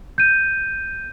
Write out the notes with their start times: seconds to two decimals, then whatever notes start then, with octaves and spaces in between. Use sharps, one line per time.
0.18 G6 D#7